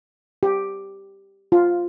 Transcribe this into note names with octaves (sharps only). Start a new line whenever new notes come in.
G4
F4